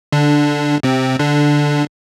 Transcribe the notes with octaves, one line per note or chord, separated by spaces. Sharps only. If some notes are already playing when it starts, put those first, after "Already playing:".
D3 D4
C3 C4
D3 D4